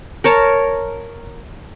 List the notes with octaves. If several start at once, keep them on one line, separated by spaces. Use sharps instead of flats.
A#4 C#5 A5